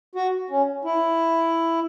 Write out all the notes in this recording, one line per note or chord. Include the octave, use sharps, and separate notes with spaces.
F#4
C#4
E4